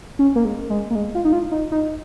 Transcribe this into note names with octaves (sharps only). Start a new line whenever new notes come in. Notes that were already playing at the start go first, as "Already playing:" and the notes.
C#4
A#3
G#3
G#3
A#3
G#3
F4
D#4
F4
D#4
D#4